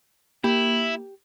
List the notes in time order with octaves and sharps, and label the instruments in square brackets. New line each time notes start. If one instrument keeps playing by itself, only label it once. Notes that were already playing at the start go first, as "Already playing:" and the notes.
[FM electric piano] A#3 [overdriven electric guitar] E4 [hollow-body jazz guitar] G4